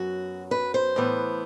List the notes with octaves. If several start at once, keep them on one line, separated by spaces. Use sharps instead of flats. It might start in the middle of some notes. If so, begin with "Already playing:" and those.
Already playing: F#2 F#3 B3 F#4
B4
C5
A2 E3 B3